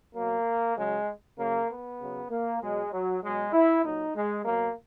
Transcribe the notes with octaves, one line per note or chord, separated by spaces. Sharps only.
B2 F#3 A#3
C#3 F#3 G#3
C#3 F#3 A#3
B3
C#3 F#3
A#3
B2 F#3 G#3
F#3
B2 F#3 G#3
E4
A#2 F#3 D#4
G#3
B2 F#3 A#3